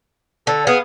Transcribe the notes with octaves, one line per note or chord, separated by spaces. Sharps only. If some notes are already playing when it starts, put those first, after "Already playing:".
D3 A4
B3 G#4 F5